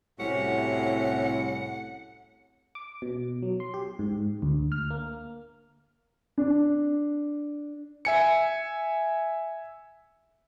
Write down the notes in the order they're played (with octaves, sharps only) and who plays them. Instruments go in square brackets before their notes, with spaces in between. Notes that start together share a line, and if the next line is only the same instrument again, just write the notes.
[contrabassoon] C2 [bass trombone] A2 [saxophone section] C3 C#4 F#4 [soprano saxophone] F#5
[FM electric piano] D6
B2
F#3
C6
G4
G#2
D2
F6
A#3
[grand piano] D4
[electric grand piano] E5 G#5 C#7